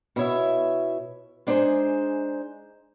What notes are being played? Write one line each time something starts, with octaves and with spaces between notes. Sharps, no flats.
B2 E4 C#5 E5
G#3 D4 D#4 G#4 C5